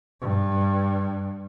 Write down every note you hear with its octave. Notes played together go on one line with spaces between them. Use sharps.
G2